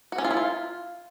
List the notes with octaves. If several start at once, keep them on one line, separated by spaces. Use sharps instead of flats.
F#4
C#4
F4
E4
F4